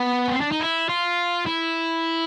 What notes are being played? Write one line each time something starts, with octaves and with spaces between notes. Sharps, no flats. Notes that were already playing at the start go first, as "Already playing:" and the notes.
Already playing: B3
C#4
C4
D4
D#4
E4
F4
E4